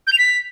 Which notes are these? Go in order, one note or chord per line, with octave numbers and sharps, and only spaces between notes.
G6
F7
B6